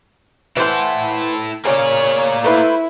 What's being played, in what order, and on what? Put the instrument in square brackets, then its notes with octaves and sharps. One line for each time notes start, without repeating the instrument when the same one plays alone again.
[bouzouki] E3 C5 F#5 [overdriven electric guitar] E4 A4
[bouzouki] C#3 G#4 [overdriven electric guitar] A#3 D5 [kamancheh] C#5
[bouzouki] A3 B4 C5 [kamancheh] E4